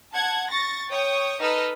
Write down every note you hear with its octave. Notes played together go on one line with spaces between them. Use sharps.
F#5 A5 G#6
C#6 A6 A#6
C#5 G5 C#6 D#6
D#4 A4 B4 D#5 E6 F6